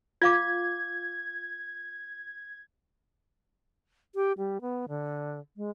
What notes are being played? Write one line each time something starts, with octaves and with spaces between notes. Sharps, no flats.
F4 F5 D6 G#6
G4
G3
B3
D3
G#3